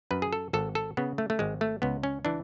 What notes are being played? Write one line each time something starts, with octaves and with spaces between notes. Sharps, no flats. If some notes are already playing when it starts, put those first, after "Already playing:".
F#2 B4
G#4
A4
G#1 A4
A4
C#3 B3
A3
A3
G#1 G#3
A3
C#2 B3
C#4
E3 D4